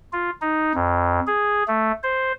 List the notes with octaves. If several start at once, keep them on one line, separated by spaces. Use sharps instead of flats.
F4
D#4
F2
G#4
A3
C5